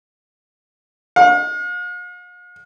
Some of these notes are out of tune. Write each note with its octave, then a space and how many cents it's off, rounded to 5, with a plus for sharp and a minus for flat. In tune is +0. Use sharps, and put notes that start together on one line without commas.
F5 +45